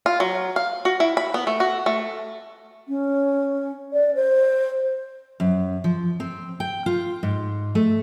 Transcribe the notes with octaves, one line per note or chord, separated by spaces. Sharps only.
F4
F#3
F5
F#4
E4
B5
B3
A3
F#4
A3
C#4
D5
C5
F#2
F3
C4
G5
F4
G#2
A3